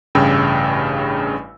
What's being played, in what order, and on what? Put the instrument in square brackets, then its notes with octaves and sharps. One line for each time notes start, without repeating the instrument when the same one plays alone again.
[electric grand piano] A1 G2 C#3 G5 E6